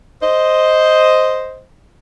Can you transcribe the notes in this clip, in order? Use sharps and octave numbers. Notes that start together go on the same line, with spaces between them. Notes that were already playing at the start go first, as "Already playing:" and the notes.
C5 D#5